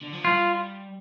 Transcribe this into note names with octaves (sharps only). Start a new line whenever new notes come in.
D3
F3
G3 F4